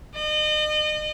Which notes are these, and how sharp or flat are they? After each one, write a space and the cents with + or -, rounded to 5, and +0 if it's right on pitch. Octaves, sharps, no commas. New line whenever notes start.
D#5 -35